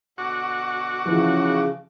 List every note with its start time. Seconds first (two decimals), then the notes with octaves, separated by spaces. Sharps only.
0.18 B2 D3 F#4 D6
1.05 C#3 E3 F3